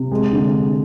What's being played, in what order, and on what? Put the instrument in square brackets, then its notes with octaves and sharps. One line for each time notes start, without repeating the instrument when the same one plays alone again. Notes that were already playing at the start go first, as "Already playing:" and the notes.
Already playing: [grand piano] C3
G#3
D3